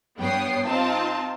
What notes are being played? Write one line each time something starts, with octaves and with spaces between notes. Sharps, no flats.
G2 B3 C#5 G5 D#6 C7
C4 D#4 F4 A5